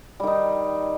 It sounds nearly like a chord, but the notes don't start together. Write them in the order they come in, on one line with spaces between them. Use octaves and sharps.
G3 D#3 D#4